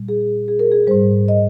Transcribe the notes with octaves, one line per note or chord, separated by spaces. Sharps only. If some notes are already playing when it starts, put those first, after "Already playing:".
Already playing: A#2 G3
G#4
G#4
A#4
G#4
G#2 G3 C5
D#5